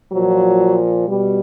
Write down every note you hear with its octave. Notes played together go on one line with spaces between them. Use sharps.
A#2 F3 F#3
B2 G3